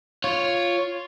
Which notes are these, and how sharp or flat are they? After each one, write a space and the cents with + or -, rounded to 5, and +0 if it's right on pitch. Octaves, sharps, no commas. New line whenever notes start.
F4 +0 C#5 +0